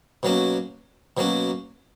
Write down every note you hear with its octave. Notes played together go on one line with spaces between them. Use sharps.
B2 F#3 A#3 C#4
B2 F#3 A#3 C#4